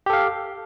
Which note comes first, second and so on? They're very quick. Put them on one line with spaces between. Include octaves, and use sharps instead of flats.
G4 A4 F5